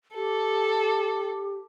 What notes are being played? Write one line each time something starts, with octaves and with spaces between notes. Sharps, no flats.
G4 A4